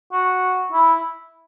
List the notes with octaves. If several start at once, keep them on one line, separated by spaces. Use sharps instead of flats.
F#4
E4